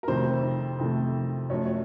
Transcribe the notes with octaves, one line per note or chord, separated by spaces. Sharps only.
A#4
F2 C3 D#3 A3 C5
F2 C3 D#3 A3
F#2 F3 A3 C#5
C#5